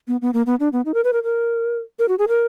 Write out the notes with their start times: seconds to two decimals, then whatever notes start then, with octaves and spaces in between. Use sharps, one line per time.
0.08 B3
0.22 B3
0.33 A#3
0.46 B3
0.60 D4
0.73 B3
0.85 D#4
0.94 A#4
1.04 B4
1.13 A#4
1.24 A#4
1.99 A#4
2.09 F#4
2.19 G#4
2.28 A#4